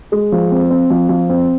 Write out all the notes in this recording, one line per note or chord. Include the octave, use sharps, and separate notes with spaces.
G#3
F3
C4
C4
F3
F3
C4